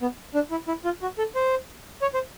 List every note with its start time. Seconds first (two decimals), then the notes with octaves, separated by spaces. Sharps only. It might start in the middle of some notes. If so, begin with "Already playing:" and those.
0.02 B3
0.35 D4
0.51 E4
0.68 E4
0.85 F4
1.02 F#4
1.18 A4
1.35 C5
2.02 C#5
2.14 C5